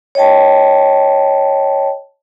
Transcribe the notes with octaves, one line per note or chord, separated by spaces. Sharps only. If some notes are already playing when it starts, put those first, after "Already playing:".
C#5 D#5 G5 A5